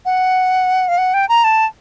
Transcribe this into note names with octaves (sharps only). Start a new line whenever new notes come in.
F#5
F5
F#5
G5
A#5
A5